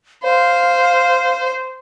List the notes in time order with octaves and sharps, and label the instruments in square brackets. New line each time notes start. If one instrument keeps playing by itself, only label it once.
[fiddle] C5 [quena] F5